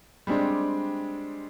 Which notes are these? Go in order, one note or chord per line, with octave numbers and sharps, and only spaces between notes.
G3 G#3 C4 D4